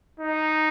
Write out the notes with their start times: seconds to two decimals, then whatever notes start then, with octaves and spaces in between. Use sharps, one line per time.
0.20 D#4